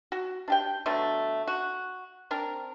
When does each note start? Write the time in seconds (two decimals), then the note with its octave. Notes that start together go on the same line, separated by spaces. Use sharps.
0.12 F#4
0.48 D4 G4 G5
0.86 B2 D3 F#3 A3
1.48 F#4
2.31 C4 D4 A#4